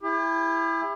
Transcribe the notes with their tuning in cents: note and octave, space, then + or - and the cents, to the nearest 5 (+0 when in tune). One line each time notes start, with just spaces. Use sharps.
E4 +5 G4 +45